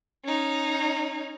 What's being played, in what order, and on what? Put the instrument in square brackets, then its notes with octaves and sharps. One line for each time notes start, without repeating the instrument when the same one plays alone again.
[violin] C#4 D#4